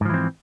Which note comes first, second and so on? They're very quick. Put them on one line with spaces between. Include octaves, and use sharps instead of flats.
G#2 F3 E3 C4